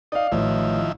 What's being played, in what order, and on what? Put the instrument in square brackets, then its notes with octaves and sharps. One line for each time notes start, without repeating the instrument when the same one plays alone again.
[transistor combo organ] D#4 [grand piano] D5 F5
[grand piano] A1 [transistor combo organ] D#3 F3 E4